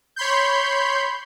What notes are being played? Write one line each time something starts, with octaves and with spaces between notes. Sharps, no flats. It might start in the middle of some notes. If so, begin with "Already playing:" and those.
C#5 B5 C6 G6